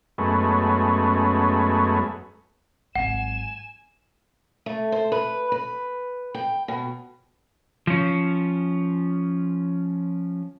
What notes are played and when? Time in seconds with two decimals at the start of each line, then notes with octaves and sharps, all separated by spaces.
0.18 F#2 G#3 A3 B3 C#4
2.95 G#1 F#3 F#5 G#5 E7
4.66 A3
4.92 C5
5.12 B4
5.52 B4
6.34 G5
6.68 B2
7.87 F3 C#4